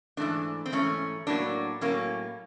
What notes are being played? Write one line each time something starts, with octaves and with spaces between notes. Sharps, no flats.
G#2 E3 A3 D4
C4
G#2 E3 A3 C#4
A2 F#3 A#3 D4
A2 F#3 A#3 C#4